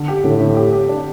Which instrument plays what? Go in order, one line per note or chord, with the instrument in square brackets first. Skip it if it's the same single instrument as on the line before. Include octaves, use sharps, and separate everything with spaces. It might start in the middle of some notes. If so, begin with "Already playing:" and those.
Already playing: [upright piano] D3
G4
[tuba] A2 [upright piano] D3
[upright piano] D3
G4
G4
D4